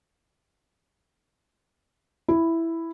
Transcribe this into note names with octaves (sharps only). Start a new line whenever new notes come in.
E4